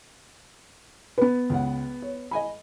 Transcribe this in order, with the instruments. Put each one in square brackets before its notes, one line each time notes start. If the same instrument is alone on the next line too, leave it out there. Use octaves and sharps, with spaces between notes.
[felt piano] B3 B4
[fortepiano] C#2 F#5
C#5
D#5 G#5 B5